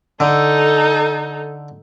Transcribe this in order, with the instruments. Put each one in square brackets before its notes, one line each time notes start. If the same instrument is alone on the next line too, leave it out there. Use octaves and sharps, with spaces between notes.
[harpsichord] D3 [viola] D#4 A4